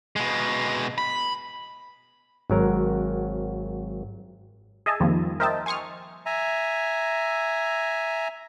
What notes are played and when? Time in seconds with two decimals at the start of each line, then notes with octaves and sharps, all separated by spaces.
0.16 B2 G#3
0.98 B5
2.50 G#1 F#3 A#4
4.86 G#4 D#5 E5 G#5 A5
5.00 F2 D#3 F3 G3 A#3
5.40 A#4 C5 D#5 E5 G5 A5
5.66 G#5 C6 C#6 D#6 F6
6.26 E5 G#5 A#5